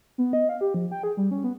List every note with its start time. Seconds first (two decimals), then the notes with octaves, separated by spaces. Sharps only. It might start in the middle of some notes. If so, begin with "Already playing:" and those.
0.18 B3
0.33 D#5
0.49 F5
0.61 G4
0.74 F3
0.91 G5
1.03 G#4
1.17 G3
1.31 C#4
1.44 B3